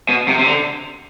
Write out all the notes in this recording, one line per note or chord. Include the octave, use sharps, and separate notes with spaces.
B2
C3
C3
D3